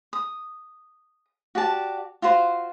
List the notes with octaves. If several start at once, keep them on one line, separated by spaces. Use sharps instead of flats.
D#6
F#4 G4 D5 A5
F4 F#4 C5